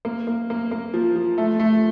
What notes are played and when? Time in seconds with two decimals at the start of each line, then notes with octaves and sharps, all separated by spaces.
0.05 A#3
0.27 A#3
0.50 A#3
0.71 A#3
0.94 F3
1.16 F3
1.38 A3
1.60 A3